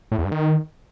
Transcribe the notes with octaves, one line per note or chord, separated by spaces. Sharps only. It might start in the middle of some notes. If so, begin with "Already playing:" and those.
A2
E2
G2
D#3